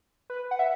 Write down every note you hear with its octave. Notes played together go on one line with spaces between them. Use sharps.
B4
F#5
E5